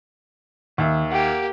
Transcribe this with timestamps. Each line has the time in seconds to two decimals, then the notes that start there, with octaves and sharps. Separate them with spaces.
0.78 D#2 D#3 E5
1.12 A#3 G4 F#5 G5